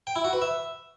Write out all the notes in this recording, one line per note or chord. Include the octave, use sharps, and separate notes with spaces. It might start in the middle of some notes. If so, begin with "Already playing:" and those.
G5
E4
F#4
B4
E5